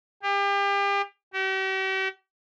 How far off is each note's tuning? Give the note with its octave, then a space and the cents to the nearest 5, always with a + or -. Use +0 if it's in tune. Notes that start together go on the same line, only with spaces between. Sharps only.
G4 +35
G4 -45